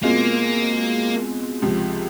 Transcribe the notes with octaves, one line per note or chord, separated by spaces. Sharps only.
B2 G#3 A#3 C4 F4
C#2 C3 F3